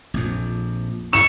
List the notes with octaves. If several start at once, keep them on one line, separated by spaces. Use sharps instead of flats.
A#1 F2
C#6 E7